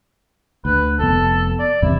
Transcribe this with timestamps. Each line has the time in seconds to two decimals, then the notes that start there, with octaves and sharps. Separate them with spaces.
0.65 D2 B4
0.99 F1 G#2 B3 A4
1.59 D5
1.82 E2 G2 C3 E4